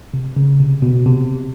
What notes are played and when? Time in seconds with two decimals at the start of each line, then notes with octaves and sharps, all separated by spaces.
0.14 C3
0.36 C#3
0.60 C3
0.82 B2
1.06 C3